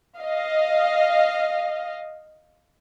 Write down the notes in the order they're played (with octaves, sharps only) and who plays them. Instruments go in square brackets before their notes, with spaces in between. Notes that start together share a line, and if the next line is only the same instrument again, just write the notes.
[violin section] D#5 F5